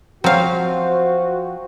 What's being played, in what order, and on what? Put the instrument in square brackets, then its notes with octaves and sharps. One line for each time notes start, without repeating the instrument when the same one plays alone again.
[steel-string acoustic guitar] F3 [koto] F#3 F5 [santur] C4 [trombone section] F#4